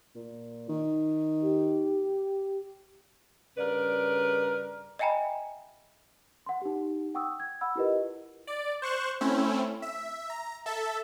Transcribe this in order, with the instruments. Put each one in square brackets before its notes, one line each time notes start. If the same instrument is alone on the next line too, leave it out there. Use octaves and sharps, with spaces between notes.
[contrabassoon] A#2
D#3
[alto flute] G4
[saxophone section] G2 C#3 A#4 B4 D5
[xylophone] D#5 E5 G5 G#5 A#5 B5
[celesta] F#5 C6
D#4 G4
F#5 G5 C#6 D#6 E6
G#6
F#5 B5 E6
E4 F4 G4 A#4 B4 D#5
[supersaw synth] D5
C5 C#6 F#6 E7
A3 C4 C#4 E4
E5
A#5
A4 E5 A5